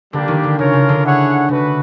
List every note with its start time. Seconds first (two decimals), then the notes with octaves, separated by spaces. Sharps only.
0.13 D3 G3 A#3 D4 G4
0.28 D#3
0.43 D3
0.58 C#3 C#4 F4 A#4 C#5
0.73 C#3
0.89 D3
1.04 E4 G#4 C#5 F#5
1.49 C#3 A3 D4 F#4 B4